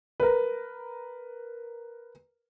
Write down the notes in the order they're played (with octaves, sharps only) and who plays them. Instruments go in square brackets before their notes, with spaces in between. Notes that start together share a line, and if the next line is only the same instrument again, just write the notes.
[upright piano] A#4 B4